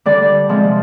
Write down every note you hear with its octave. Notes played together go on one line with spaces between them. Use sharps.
D3 G3 D5
C3 F3 G#3